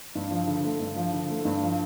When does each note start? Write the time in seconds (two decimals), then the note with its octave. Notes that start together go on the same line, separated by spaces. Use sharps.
0.15 G2
0.31 F3
0.47 D3
0.64 A3
0.80 G2
0.96 F3
1.12 D3
1.29 A3
1.45 G2
1.62 F3